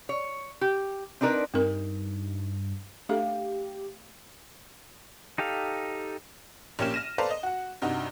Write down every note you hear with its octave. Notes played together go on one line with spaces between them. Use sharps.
C#5
G4
C4 D4 D#4 A#4 B4
G2 C4 D#4 A#4
A3 D4 G4 A4 F5
D#4 G4 A4 F5
A#1 A#3 C#4 G4 F6 E7
F6 A#6 D#7 E7
A4 B4 C5 D5 F5 A#5
D#5
F#4 F#5
G2 C3 D#4 F#4